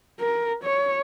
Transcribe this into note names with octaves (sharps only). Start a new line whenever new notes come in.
A#4
C#5